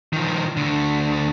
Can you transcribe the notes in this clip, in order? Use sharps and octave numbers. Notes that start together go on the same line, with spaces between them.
D#3 F3
D2 D3